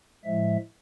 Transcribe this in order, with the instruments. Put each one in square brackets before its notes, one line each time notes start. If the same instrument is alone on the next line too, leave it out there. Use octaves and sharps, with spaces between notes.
[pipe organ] A2 F3 G#3 E5